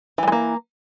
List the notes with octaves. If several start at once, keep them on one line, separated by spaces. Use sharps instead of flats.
E3 G3 G#3 A#3